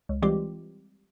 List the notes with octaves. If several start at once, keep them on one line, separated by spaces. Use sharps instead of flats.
C#2
E3 G3 G#3 C4 F4 G4